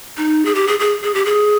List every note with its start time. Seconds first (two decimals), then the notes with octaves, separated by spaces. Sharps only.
0.17 D#4
0.45 G#4
0.55 G4
0.67 G#4
0.80 G#4
1.03 G#4
1.14 G4
1.26 G#4